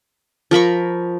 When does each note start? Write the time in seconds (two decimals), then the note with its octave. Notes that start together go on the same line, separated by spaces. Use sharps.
0.51 F3 A#4 B5 C#6